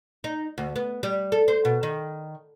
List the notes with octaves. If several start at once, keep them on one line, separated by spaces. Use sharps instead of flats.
D#4
D2
B3
G3
A4
C5
B2
D#3